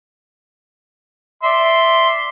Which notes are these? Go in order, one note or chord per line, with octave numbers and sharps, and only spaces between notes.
D5 E5 C6